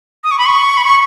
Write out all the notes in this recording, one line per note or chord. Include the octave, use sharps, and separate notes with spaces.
D#6
C#6
B5
C#6
B5
C#6